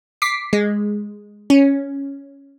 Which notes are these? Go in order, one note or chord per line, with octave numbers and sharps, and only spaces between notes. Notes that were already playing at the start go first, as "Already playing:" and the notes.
D6 B6 C7
G#3
C#4